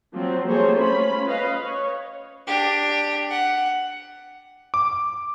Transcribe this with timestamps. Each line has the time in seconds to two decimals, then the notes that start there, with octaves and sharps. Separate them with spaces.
0.13 F3 F#3 C4
0.48 G3 A3 A#3 G#4 C5 C#5
0.78 C#4 F4 B5
1.26 B4 D#5 F5
1.60 C#5
2.47 D4 G4
3.30 F#5
4.74 D6